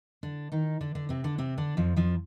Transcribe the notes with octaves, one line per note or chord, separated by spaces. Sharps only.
D3 D4
D#3 D#4
D3 D4
D3 D4
C3 C4
D3 D4
C3 C4
D3 D4
F2 F3
F2 F3